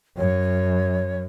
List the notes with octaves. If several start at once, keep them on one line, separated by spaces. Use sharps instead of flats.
F#2 C#5